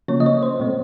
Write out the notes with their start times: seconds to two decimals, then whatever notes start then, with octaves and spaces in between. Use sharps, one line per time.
0.08 C#3 F3 A#3 C#4 C#5
0.20 D#5
0.26 C#5
0.43 C5
0.60 A#2 A3 C4